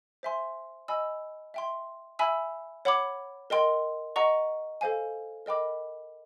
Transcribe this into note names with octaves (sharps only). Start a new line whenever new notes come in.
C5 E5 G#5 C6
D#5 G#5 B5 E6
E5 G5 C6
E5 G#5 B5 E6
C#5 F#5 B5 D6
A#4 D#5 G5 C6
D#5 F#5 A#5 C#6
A4 C5 F5 G#5
A#4 D#5 G5 B5 D6